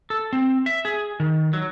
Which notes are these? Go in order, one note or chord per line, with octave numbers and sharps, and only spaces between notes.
A4
C4
E5
G#4
D#3
F#3